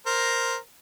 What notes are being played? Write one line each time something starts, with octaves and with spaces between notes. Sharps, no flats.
A#4 C5